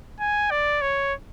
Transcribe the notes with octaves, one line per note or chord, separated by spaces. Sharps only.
G#5
D5
C#5